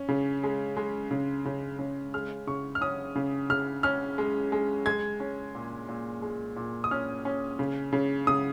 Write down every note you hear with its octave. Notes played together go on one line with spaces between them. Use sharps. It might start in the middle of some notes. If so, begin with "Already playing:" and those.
Already playing: C#4
C#3
G#3
G#3
C#3
C#3
C#3
G#3 F6
C#3 C#6
F6
C#4 D#6
C#3
C#3 F6
C#4 F6
G#3
G#3
G#3 G#6
C#4
A#2
A#2
G#3
A#2
D#6
C#4 F6
C#4
C#3
C#3
C#3 D#6